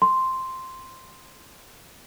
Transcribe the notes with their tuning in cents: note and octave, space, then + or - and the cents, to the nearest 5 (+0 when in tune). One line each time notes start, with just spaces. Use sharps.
C6 -5